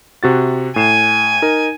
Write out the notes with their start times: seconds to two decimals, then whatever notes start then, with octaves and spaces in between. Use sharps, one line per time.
0.23 C3 F#4 A6
0.76 A2 G#5 C7 E7
1.42 D#4 A#4